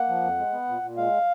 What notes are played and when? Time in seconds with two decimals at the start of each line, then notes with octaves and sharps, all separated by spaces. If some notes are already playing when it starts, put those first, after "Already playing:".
Already playing: A#3 F#5
0.09 F3
0.23 F2
0.38 G#3
0.53 B3
0.69 A#2
0.83 A#2
0.97 G#3 F5